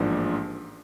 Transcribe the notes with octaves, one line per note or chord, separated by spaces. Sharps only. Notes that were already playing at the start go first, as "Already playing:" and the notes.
Already playing: A1 G#2 F3 A#3 D4